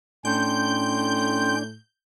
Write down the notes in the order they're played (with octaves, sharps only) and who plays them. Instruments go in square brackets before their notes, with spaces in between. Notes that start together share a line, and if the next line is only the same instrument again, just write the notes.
[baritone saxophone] A2 [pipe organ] C#4 G5 C6 [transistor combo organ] D4 [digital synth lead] G6